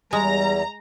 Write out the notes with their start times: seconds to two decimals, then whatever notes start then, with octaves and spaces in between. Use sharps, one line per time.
0.13 E2 G3 G#3 A#5